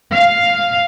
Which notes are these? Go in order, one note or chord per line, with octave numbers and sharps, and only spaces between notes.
F5